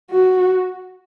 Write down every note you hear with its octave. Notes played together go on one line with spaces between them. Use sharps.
F#4